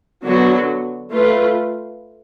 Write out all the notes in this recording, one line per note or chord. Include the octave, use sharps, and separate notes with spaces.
D3 F#3 B3 D4 F#4
A3 F4 B4